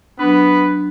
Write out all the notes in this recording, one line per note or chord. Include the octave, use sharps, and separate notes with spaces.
F#3 B3 D4 B4